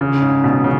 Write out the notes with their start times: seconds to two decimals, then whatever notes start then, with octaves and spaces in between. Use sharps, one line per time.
0.01 C#3
0.21 G#2
0.44 B2
0.64 C#3